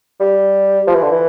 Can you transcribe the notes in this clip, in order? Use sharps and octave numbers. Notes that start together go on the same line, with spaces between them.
G3
F3
E3
D3
E3